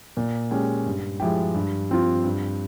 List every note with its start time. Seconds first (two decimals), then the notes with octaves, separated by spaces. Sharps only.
0.17 A#2
0.51 G#3 C#4 G4
0.86 G2
1.20 F3 G#3 E4 G4
1.54 G2
1.90 F3 C4 F4
2.24 G2